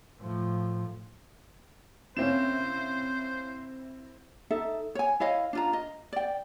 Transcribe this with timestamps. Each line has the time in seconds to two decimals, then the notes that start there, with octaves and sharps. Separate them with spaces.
0.19 A2 F3
2.17 C3 A#3 C4 C#4 E4 C5 E7
4.51 D#4 A4 E5
4.95 C#5 G#5
5.20 E4 C#5 D#5 F5
5.53 D4 F4 A#5
5.73 D#5
6.13 D5 G5